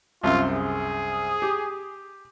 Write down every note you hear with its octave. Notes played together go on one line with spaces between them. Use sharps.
C2 F#2 F4
G#4
G4